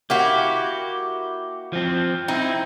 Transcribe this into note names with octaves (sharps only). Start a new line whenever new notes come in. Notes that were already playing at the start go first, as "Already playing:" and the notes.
A#3 E4 F#4 G4
F3 C4
C4 D#4 E4